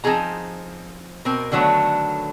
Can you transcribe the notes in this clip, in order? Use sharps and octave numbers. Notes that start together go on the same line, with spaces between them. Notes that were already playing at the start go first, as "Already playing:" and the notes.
F3 C4 D#4 G#4 A#5
B2 C4 A#4
D3 D#3 F#3 A3 B3 D4